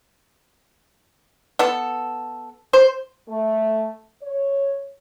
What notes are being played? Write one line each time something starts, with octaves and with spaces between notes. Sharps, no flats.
B3 A4
C5
A3
C#5